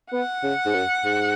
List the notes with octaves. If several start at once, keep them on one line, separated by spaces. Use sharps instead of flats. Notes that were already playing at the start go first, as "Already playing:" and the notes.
B3 F#5
C#3
G#2
F#2
G#2